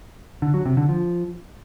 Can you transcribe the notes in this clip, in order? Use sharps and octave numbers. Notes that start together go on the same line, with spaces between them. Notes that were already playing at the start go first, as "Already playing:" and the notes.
D3
F#3
C3
D3
F3